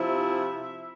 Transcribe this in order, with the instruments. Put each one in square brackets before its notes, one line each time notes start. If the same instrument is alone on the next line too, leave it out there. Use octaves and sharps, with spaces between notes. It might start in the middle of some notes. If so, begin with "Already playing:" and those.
Already playing: [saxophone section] C3 F3 C4 E4 E5